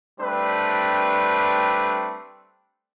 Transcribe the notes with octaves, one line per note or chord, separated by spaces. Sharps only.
G3 A3 C4 D4 B4